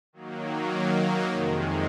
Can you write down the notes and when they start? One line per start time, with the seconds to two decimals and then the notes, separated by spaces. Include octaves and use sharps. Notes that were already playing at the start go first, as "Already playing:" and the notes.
0.13 D#3 F#3 A#3
1.30 F2 C3 D#3 G#3